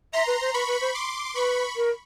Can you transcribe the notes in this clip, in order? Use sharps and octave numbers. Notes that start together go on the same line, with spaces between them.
E5 A#5 C6
B4
C5
B4 B5 C#6
B4
C5
C6 D6
B4 B5 C#6
A#4